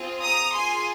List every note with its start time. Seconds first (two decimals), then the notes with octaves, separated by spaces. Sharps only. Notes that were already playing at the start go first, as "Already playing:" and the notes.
Already playing: C4 F4 G#4
0.22 A#5 D#6
0.53 A#3 F4 G#4 G#5 C6